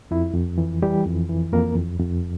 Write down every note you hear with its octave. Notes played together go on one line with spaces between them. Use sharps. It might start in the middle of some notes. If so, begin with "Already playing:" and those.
F2 E4
F2
E3
E3 G3 G4
F2
E3
F2 A#3 A#4
F2
F2